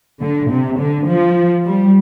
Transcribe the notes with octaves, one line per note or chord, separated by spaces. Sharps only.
D3
C3
D3
F3
G3